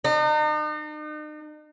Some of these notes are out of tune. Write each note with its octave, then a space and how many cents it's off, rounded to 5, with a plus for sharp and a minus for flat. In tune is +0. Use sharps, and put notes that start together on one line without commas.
D#4 -40